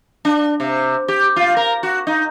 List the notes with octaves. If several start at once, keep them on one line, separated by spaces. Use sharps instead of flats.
D4
C3
G4
F4
A#4
F#4
D#4